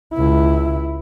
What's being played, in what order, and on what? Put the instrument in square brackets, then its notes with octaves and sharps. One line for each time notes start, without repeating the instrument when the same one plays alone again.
[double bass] C#2 E4